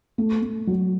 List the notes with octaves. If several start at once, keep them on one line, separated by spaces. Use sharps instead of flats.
A3
A3
F#3